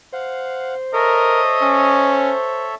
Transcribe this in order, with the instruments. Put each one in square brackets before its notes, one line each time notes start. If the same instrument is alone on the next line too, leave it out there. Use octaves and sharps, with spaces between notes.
[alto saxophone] C5 [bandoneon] F5 F#5
[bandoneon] A4 C#5 E5 [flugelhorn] A#4 [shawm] D#5
[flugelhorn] C#4